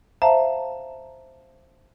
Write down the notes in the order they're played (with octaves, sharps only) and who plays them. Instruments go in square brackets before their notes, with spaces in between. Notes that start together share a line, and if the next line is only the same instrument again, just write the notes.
[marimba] C5 E5 F5 A5 A#5